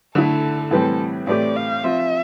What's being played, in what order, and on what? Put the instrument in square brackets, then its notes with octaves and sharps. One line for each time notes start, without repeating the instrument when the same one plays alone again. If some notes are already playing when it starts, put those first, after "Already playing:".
[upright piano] D3 A3 E4 [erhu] A4
[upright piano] A2 E3 G3 C4 [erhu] A4
[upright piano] A2 E3 A3 C4 G4 [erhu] D5
[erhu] F5
[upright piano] F3 C4 F4 [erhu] E5